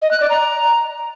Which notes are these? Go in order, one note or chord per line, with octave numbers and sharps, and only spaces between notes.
D#5
F#6
D5
A#5